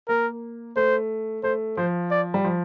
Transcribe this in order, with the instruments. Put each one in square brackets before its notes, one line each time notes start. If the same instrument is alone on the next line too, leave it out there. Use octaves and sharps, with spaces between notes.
[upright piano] A#3 [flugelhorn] A#4
[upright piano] A3 [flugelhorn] C5
[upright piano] A3 [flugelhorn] C5
[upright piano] F3 [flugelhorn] C5
[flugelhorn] D5
[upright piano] G3
F3